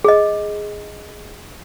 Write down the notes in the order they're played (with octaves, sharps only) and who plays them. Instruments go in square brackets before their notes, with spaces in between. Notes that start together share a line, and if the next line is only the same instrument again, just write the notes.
[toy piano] G#4 D#5